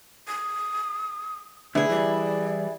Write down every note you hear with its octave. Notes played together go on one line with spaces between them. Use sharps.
D#6
D3 A3 B3 E4 G#4
E3 G3 D5